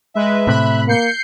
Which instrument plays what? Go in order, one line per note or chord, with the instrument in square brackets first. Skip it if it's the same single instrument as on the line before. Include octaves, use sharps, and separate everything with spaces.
[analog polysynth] G#3 B4 [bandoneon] E5
[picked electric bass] A2 C3 [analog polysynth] B5 F#6
[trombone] A#3 [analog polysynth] G6 C7 C#7